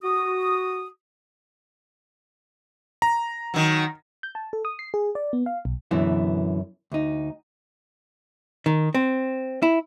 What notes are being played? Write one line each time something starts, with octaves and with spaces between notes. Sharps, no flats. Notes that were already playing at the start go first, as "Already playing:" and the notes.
F#4 D#6
A#5
D#3 F#3
G6
A5
A4
D#6
C7
G#4
D5
B3
F5
B1
F#2 B2 D3 E3 E4
D2 D#4
D#3
C4
E4